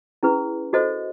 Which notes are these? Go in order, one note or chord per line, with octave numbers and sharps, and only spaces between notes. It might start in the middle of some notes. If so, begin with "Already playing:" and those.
C#4 E4 G#4 B4
F#4 A4 C5 D#5